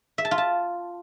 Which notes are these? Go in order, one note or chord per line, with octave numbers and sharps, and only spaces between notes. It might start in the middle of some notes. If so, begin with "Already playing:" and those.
E5
A5
F4
A5